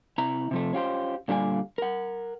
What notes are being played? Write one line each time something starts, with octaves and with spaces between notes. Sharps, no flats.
C3 E4 A#5
C3 F3 A3
C#4 F4 G4 C5
A#2 D3 G3 F4 D5 G#5
A#4 F#5